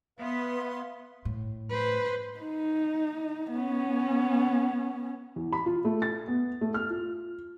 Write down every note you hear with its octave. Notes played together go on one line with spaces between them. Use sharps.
B3 B4 E5 F5 C6 D#6
A2
B4 C5
D#4
B3 C#4
E2
B5
F4
A3
A6
B3
A3
F6
F4